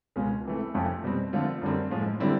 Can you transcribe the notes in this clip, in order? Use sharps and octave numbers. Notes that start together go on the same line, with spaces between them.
C#2 B2 G#3 C#4 F4
C3 E3 A3
F2 C3 F3 A3 C#4
B2 G3 C4
D3 F3 A3 C4 F4
F#2 D3 G3 C4
A2 F3 G#3
D3 G3 C4 E4